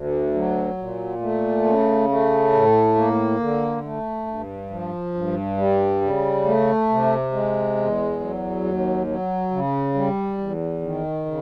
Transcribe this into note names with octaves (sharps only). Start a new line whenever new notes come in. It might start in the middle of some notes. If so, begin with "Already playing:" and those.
Already playing: D2
F#3
A#2
A3
C#3
A3
A2
A#3
D3
A3
G2
F3
G2
G3
C#3
A3
C3
G#3
E2
F#3
D#2
F#3
C#3
G3
E2
D#3
C#3